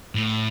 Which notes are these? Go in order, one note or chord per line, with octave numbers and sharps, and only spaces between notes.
A2